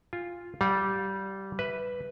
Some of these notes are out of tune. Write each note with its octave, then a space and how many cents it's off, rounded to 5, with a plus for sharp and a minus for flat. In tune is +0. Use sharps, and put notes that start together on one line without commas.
F4 +0 G#5 -40
G3 -15 F5 +35
B4 +0 E5 -15